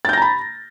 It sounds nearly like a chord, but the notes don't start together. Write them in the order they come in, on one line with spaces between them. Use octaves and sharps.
A6 G6 A#6 A#5 B5